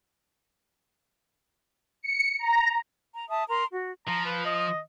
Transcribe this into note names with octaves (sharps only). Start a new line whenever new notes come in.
C#7
A#5
A#5
E5 A5 D#6
A#4 A#5 C6
F#4
F3 A#5
B4
D#5